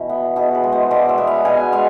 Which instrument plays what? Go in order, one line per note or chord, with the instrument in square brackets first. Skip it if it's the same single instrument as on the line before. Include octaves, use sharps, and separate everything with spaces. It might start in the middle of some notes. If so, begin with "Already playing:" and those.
Already playing: [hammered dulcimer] B2 E3
B3
B2 G#4
B4
G#3
C5
B2 D5
E5
B3
F5
B2 G#5
G#3 F5